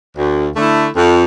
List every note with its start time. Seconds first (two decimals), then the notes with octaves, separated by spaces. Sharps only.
0.16 D2
0.55 D3 A3 E4
0.96 F2